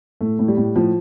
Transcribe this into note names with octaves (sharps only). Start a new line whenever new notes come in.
A2 A3
A2
G3
A2
A2 F3